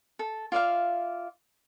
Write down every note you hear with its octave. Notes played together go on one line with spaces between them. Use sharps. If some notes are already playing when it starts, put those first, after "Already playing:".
A4
F4 D5 E5 F5